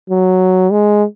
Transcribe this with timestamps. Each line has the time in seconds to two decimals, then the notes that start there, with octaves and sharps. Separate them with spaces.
0.10 F#3
0.72 G#3